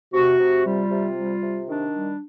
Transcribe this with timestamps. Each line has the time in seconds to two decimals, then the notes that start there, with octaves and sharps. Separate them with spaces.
0.13 C3 F#4
0.39 C3
0.65 G3 F4
0.91 C3
1.17 G3
1.43 C3
1.69 D#3 D4
1.95 G3